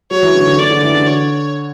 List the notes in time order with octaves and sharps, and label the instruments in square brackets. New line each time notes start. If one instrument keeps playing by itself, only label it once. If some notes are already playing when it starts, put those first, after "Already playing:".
[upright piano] F#3 [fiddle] C#5
[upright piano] E3
D3
D3
[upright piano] D3 [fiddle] D5
[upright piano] D3
E3
D3
[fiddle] C#5